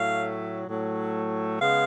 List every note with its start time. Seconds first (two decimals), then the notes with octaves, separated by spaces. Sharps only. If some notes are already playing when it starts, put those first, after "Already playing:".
Already playing: A2 F#3 A3 F5
0.65 A2 F#3 A3
1.59 C#3 G#3 B3 F5